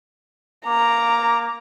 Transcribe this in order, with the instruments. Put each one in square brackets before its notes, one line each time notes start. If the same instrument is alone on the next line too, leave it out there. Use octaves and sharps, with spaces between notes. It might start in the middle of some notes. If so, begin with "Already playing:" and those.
[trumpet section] A#3 D6 [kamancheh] A#5